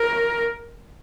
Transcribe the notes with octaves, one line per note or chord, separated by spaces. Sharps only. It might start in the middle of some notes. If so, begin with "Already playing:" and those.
Already playing: A#4